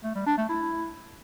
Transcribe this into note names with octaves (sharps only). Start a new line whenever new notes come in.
A3
G3
D4
A3
E4